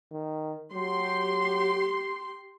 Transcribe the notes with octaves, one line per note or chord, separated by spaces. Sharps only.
D#3
F#3 G4 C6